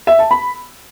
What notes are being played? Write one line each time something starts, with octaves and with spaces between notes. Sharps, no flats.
E5
A5
B5